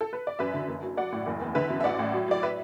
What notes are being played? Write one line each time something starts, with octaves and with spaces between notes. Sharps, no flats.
A4
B4
D5
F#2 B4 E5
D3
F#1
F#3
F#3 D5 F#5
A2
F#1
E2
D3 B4 E5
F#2
E5
A1 D5 F#5
A2
F#3
F#3 D5
B4 E5